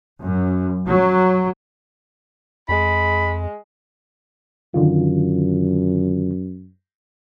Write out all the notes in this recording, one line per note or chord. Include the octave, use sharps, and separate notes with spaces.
F#2
F#3
F2 G#3 B5
F#2 D3 D#3 F4